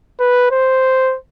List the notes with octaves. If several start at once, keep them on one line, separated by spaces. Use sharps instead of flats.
B4
C5